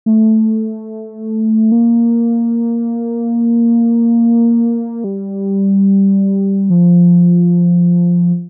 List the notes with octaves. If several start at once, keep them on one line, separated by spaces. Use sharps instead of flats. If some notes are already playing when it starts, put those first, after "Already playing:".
A3
A#3
G3
F3